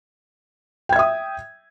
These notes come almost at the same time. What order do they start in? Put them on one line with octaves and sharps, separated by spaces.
G5 G#6 E5 D#6